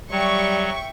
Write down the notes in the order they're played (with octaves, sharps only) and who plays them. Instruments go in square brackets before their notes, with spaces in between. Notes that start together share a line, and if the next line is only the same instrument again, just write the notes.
[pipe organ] F#3 [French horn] G3 [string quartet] E5 G5 [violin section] C#6